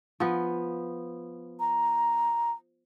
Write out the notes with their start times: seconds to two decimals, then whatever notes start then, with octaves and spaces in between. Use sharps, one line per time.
0.20 F3 B3
1.60 A#5